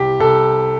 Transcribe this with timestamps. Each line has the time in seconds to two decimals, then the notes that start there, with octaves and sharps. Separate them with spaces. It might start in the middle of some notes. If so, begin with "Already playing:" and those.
Already playing: C2 G4
0.20 C2 A4